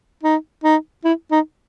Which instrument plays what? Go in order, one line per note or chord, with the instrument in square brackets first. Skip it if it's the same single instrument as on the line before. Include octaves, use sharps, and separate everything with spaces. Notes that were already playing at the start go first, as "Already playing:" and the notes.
[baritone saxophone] D#4
D#4
E4
D#4